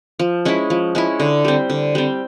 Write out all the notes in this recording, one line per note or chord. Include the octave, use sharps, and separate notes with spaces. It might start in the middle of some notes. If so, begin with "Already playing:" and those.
F3
G#3 C#4 E4
F3
G#3 C#4 E4
D3
G3 C4
D3
G3 C4